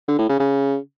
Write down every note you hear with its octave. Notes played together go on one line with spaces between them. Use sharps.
D3
A2
C#3
C#3